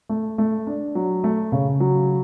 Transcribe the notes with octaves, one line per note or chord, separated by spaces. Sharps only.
A3
A3
D4
F#3
A3
C#3
F#3